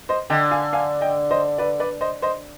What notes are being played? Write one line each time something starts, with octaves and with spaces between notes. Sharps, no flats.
C5 D#5
D3 D#5 G5
F5 G#5
F5 G#5
D#5 G5
C5 D#5
B4 D5
B4 D5
C5 D#5
C5 D#5